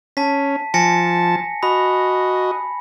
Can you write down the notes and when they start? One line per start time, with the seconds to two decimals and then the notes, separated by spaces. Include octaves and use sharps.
0.17 C#4 A5 B6
0.74 F3 G#5 A5 A#6 C#7
1.63 F#4 D#5 B5